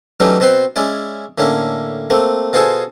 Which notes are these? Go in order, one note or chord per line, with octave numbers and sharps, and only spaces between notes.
E3 F#3 G3 A3 C#4 D#4
B2 C4 B4 C5 C6
G#3 C#4 E4 D5
A2 D3 A#3 C#4 E4
A3 A#3 C4
B2 F4 G#4 A4 C5 G#5